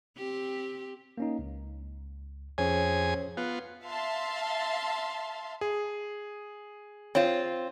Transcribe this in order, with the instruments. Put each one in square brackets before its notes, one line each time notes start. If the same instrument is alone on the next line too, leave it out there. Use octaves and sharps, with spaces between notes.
[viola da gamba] C4 G4
[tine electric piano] A#3 C#4 D#4
C#2
[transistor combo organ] F2 G#4 G#5 [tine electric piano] C#4 C5 C#5
[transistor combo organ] B3 F4 [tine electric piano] F#6
[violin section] E5 F5 A5 C6
[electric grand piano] G#4
[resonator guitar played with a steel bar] C4 F4 [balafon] C#5